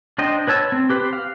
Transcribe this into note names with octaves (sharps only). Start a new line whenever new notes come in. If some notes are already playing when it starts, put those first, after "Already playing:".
D4 C5 D#5 G5
B4 C#5 A5 E6
C4
G4 B4 C5
F5